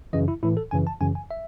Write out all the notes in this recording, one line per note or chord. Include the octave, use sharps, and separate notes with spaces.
F#2 C#3 E3 D#5
E4
A2 E3 E4
A4
F#2 C#3 E3 G#5
A5
F#2 C#3 E3 G#5
G#5
E5